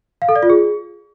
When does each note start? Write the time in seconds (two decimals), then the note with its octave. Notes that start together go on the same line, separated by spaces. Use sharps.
0.22 F5
0.29 A4
0.36 D5
0.43 F4
0.50 G#4